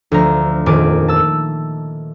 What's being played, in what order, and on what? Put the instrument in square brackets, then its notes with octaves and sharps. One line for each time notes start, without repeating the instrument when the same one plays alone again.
[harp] D2 F3 A#5
D#1 F2 D#3 G#5 D6
A5 E6